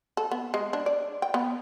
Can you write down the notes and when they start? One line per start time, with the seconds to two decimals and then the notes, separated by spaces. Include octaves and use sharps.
0.17 A4
0.31 B3
0.54 G#3
0.73 D4
0.86 D5
1.22 G5
1.34 B3